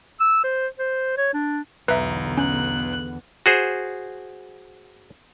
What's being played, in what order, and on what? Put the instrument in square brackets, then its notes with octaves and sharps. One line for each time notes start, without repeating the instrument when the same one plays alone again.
[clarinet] E6
C5
C5
C#5
D4
[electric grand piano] B1 A#5 [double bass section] E2 D3 B3 [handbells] B4 E5
[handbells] C#4 [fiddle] F#6
[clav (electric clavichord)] F#4 G#4 C5